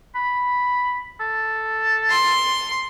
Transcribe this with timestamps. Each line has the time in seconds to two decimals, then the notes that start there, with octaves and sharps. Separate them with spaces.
0.15 B5
1.20 A4
2.11 C6